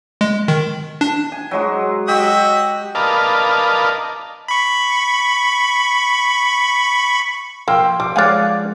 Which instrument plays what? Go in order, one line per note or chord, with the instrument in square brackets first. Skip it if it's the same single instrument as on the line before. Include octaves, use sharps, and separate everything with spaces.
[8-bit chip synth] G#3
D#3
D4
[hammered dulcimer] G#5
F#3 G#3 F#4
[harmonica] F#4 D#5 E6 [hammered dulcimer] G4
[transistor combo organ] A#4 B4 D5 D#5 F5 A5
[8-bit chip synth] B5 C#6
[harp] F3 [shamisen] A#3 [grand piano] G5 C6 E6
[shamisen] G3 [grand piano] D6
[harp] F3 G#3 D#4 [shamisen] C#5 G#5 [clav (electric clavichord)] D5 F5 F#5